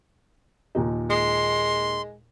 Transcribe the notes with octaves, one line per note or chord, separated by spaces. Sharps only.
D#2 A#2 D#4
G#3 C6